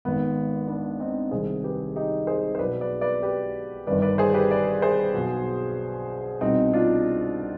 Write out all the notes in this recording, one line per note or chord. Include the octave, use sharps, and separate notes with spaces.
G#1 G#2 D#3 B3
B3 D4
C4 D#4
C2 C3 D#3 G#4 C5
G4 B4
D#4 G4
G#4 C5
C5
B1 B2 B4 D5
B4 D5
B4 D5
G4 B4
G1 G2 D#3 B4 D5
B4 D5
G#4 C5
G4 B4
B4 D5
G#4 C5
B1 B2
C2 B2 C4 D#4
D4 F4